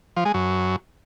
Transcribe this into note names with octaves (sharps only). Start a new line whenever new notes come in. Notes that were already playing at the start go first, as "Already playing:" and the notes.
F3
G#3
F#2